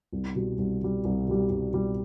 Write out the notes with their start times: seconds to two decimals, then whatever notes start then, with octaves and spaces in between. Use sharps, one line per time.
0.13 C2
0.35 B2 G3
0.58 C2
0.82 B2 G3
1.05 C2
1.27 B2 G3
1.50 C2
1.73 B2 G3